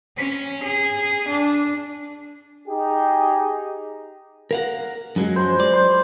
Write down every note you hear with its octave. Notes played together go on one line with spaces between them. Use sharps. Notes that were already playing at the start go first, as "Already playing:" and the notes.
C#4
G#4
D4
D#4 G4 G#4
A#4 F5 F#5
F#2 F#3 G#3
C5
D5
C5